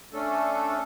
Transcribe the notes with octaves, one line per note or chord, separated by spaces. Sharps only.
A3 C#4 D4 A4